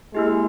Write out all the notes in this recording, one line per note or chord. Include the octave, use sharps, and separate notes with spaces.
G#3 A#3 E4 G4